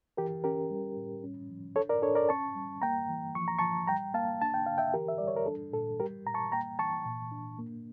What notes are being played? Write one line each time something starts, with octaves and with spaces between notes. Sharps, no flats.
E3 G4 A#4
C#4 G4 A#4
G3
A2
C#4
F3
D4 A4 C#5
A#4 D5
D4 A4 C#5
A#4 D5
C#4 A5 C#6
G3
A#3 G5 A#5
E3
F3 C#6
A#5
F3 A5 C#6
G3 G5 A#5
A#3 F5 A5
D4 A5
G5
D3 F5
E5 G5
E3 G4 A#4
E5
G3 D5
C#5
A#4
D4 A4
A#2 A4
G3 G4 A#4
A#2 A#5
A5 C#6
A#3 G5 A#5
E3 A5 C#6
A#2
D4
A#3